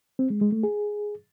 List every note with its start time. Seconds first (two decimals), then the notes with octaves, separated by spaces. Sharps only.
0.19 C4
0.30 G#3
0.41 G#3
0.52 A3
0.63 G#4